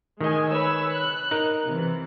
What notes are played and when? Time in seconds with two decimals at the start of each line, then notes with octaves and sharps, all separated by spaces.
0.21 D#3 G#3 D#5 G#5
0.49 B4 C#5 E6
0.91 F#6
1.31 D#4 A#4
1.65 C3 E3